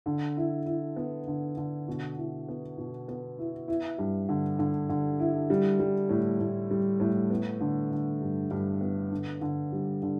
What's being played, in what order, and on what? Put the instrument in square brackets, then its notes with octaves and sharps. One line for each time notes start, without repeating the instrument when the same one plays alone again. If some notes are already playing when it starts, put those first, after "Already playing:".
[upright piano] D3
E4
E4
B3
D3
D3
B2
E4
B3
B2
B3
E4
E4
G2
D3
D3
D3
E4
G3
G3
A2
A2
G3
A2
B3
D3
D3
G2
G2
B3
D3
D3
G3
D3